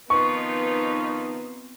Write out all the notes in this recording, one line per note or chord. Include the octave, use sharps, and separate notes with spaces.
D#3 F3 B3 C4 D#4 F4 B4 C#6